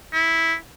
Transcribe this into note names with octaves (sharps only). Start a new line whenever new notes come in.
E4